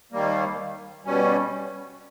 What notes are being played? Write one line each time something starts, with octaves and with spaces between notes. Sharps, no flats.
D#2 D#3 G3 A#3
B2 G3 C#4